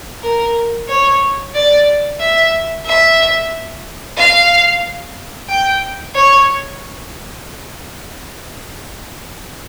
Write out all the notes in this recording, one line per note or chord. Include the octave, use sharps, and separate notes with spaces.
A#4
C#5
D5
E5
E5
F5
G5
C#5